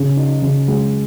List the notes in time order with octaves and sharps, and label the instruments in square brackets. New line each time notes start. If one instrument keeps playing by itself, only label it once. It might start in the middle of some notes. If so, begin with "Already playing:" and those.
Already playing: [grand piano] C#3
D#4
C#3
G#3